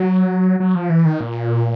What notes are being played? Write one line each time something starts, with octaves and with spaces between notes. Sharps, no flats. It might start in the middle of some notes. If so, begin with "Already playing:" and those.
Already playing: F#3
F#3
F3
E3
D#3
A#2